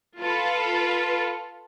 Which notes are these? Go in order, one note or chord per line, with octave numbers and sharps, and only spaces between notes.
F4 A4 B4